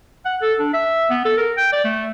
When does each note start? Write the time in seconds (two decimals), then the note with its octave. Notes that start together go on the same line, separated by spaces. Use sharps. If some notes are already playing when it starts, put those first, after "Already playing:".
0.25 F#5
0.42 A4
0.59 D4
0.73 E5
1.10 B3
1.25 A4
1.37 A#4
1.57 G5
1.72 D5
1.84 A3